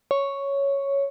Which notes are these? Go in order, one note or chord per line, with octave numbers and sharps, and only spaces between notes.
C#5